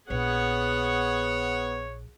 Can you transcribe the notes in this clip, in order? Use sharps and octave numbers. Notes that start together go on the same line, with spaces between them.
A#1 B3 G#4 C#5 F#5